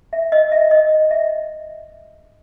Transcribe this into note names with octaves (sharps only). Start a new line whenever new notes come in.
E5
D#5
E5
D#5
E5